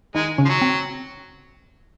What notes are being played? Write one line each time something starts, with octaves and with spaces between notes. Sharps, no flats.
D#3 G#3 D#4
C#3 C#4
F3
F#3
C4